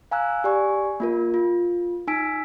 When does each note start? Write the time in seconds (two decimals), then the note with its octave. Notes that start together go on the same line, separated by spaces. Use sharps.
0.11 F5 G#5 A#5 E6 F#6
0.44 G4 D5 G#5 C#6
1.00 A#3 F4 A#4
1.34 F4
2.07 D#4 G#5 E6 B6 D7